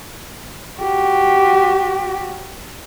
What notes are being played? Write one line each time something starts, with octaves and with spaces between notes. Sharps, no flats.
F#4 G4